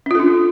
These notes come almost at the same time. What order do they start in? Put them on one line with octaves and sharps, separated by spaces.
C#4 F4 A4 D4